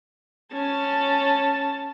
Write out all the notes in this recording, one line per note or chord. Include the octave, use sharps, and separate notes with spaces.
C#4 A5